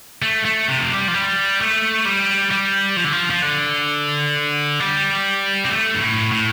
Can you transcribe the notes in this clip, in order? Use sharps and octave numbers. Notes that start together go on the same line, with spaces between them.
A3
A3
C3
F3
G3
F3
G3
A3
G3
G3
F3
D3
F3
F3
D3
G3
C4
A3
G2
A2
A2